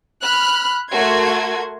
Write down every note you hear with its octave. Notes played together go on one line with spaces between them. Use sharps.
B5 F6 F#6
A3 F#4 A#4 C6 G#6